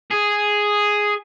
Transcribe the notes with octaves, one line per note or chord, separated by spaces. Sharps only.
G#4